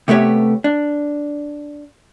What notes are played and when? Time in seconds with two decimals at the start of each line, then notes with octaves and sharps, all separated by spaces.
0.08 C3 A3 B3 G4 C#5
0.64 D4